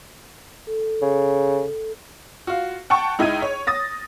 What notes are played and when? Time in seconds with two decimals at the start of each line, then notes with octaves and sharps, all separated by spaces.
0.67 A4
1.02 C#3
2.47 F4 F#4
2.90 F#5 G5 A5 C#6
3.19 C#2 D#4 E4 G#6 D#7
3.42 C#5
3.67 D#6 A6 A#6